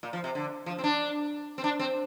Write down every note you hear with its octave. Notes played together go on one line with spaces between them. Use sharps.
A#2
F3
C3
D3
F3
C4
D4
C4
D4
C4